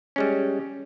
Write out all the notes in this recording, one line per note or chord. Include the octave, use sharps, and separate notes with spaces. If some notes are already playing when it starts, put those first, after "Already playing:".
G3 G#3 C#4